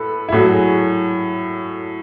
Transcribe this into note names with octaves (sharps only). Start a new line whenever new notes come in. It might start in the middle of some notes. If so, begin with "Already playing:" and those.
Already playing: A2 A4 B4
E4
A2 F#3 F#4
G#4